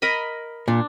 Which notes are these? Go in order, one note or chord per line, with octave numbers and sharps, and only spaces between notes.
A#4 D#5 B5
A#2 D4